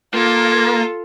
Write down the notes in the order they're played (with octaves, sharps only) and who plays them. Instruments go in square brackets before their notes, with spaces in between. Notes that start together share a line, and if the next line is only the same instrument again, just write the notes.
[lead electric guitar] A#3 [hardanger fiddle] F4 A4